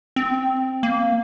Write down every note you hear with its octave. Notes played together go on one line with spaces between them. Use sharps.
C4
A#3